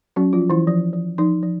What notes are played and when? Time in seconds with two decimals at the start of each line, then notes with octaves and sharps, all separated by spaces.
0.16 F#3 C#4 F#4
0.33 F3 F4
0.41 F#3
0.50 E3 E4
0.67 F3
0.93 F3
1.18 F3 D#4
1.43 F3